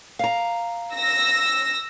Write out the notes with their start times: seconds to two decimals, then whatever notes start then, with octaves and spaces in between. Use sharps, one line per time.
0.19 F5 A#5
0.95 E6 A#6